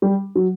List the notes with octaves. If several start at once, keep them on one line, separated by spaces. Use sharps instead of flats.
G3
F#3